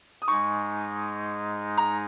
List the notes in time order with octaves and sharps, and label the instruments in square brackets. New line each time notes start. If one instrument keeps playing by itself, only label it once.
[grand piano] D#6
[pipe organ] G#2 G#3 D#4 [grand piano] C#6
[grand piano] A#5